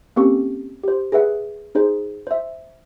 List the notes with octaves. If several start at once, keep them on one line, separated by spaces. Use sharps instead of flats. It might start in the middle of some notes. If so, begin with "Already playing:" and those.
A#3 C4 C#4 G4 A4 C#6
G4 C5
G#4 B4 E5 F#5
D#4 G#4 C5
C5 E5